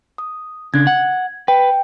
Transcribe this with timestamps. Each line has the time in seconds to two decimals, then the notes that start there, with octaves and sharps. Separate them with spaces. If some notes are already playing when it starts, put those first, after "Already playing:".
0.18 D#6
0.74 C#3 D4 G#6
0.87 F#5
1.48 B4 G5